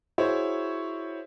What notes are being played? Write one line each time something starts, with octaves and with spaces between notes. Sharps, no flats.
E4 F#4 G#4 C5 C#5